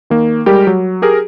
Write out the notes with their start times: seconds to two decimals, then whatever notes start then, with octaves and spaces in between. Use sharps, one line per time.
0.10 D#3 A#3
0.46 G3 G#3 G4 A#4
0.67 F#3
1.02 G4 G#4 A#4